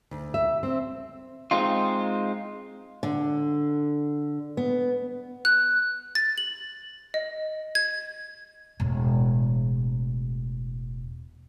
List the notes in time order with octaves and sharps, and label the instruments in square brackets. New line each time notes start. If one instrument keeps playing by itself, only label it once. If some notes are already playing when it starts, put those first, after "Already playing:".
[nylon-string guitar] D2
E5
C4
[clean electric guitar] G#3 C4 D#4 F4
[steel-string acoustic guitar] D3
B3
[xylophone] F#6
A6
F#7
D#5
G#6
[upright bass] E1 A2